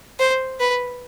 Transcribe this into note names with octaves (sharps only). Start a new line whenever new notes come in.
C5
B4